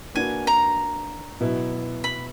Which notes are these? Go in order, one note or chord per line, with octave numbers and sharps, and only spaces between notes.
A#3 D4 F#4 B4 G#5
A#5
B2 F#3 B3 E4
B5